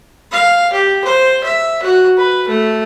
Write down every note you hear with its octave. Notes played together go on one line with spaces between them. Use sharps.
F5
G4
C5
E5
F#4
B4
A3